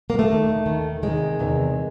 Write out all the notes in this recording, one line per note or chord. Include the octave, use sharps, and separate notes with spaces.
A#3
A3
D#2 D#3
D#2 D#3
E2 C3 D#3 G#3
E2 C3 D#3